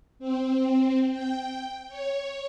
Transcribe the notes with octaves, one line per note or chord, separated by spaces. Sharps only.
C4
G5
C#5